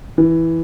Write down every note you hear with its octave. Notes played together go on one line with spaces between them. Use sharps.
E3